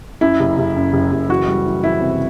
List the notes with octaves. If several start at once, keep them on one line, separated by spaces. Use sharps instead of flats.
F#2 E4
F#1
F#1
F#2
F#1
F#1
E3 F#4
G3
E3
E3 E4
C3